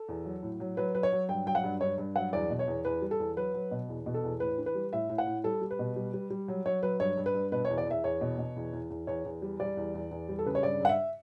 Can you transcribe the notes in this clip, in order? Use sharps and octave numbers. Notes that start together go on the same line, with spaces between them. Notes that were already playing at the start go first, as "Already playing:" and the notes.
Already playing: A4
E2
F#3
A2
F#3
F#3 B4
F#3 B4
C#5
F#3
G2 G5
F#3 G5
F#5
G2
G2 C#5
G2
F#3 F#5
E2 D5
B2
C#5
E2
E2 B4
G3
A4
E2
F#3 B4
F#3
B2
E2
B2
A4
E2
A2 B4
E3
B4
G3
A2 E5
A2
F#5
A2
G3 A4
G3
B4
B2
G3
G3
G3
F#3
F#3 C#5
F#3 B4
G2 C#5
G2
B4
G2
B2 B4
C#5
E2
D5
E2 E5
E2 C#5
B2
B2
E2
E2
E2
E2 C#5
E2
G3
G3 D5
E2
E2
E2
G3
A4
C#3 B4
C#5
G2 D5
G2 F#5
E5